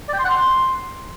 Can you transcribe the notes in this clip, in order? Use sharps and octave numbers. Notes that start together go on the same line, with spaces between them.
D5
G5
C6
F#5
C6